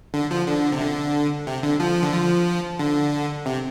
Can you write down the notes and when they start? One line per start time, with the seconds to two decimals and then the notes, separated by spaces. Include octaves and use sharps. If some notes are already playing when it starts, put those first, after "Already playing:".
0.14 D3
0.31 F3
0.47 D3
0.72 C3
0.80 D3
1.47 C3
1.63 D3
1.80 F3
2.03 D3
2.13 F3
2.79 D3
3.46 C3